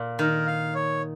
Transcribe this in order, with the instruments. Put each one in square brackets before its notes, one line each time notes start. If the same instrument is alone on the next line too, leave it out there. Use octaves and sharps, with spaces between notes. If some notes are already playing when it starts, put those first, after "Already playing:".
Already playing: [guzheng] A#2
[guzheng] D#3 [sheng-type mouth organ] A#4
[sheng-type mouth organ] F5
C#5